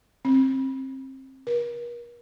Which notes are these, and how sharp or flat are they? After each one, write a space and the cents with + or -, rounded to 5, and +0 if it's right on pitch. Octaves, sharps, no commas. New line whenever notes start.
C4 +25
A#4 +40